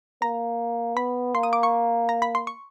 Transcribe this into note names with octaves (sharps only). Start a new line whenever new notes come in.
A#3 A#5
B3 B5
A#3 C6
D#6
D6
C#6
A#5
B5
C6
C#6